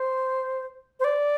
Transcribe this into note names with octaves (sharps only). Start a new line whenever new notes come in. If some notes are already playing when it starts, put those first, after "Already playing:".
Already playing: C5
C5
D5